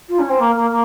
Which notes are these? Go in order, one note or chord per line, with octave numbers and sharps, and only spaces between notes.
F4
C#4
C4
A#3
A#3
A#3